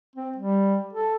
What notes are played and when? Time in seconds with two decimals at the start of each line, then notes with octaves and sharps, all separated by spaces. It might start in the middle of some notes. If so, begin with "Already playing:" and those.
0.16 C4
0.37 G3
0.93 A4